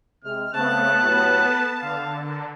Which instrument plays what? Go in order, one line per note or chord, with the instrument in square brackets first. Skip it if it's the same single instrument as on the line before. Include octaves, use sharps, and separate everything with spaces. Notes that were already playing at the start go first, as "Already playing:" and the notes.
[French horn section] C3 G#3 [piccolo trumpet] F6
[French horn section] C#3 C4 [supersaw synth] A3 B3 [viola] A5 [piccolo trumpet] F#6
[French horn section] A2 F#3 G4 [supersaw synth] B3 B4
[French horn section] A4
[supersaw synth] D3 [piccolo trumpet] F5
[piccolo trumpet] A#4